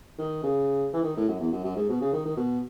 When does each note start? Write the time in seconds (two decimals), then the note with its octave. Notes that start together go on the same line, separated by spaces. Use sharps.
0.19 D#3
0.43 C#3
0.93 E3
1.03 D#3
1.16 A2
1.28 F#2
1.40 E2
1.52 F#2
1.64 F#2
1.76 G#2
1.89 B2
2.01 C#3
2.13 D#3
2.25 D#3
2.37 B2